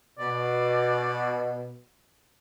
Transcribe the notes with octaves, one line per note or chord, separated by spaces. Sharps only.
B2 D5